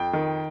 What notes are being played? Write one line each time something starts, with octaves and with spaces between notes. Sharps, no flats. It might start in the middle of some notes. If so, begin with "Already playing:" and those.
Already playing: F2 G5
D#3